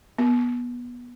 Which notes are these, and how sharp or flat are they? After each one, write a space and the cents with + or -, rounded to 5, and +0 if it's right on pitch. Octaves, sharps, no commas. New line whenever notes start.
B3 -20